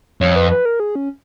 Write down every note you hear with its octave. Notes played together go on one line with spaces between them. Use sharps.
F2 C#5
B4
B4
A#4
G#4
C#4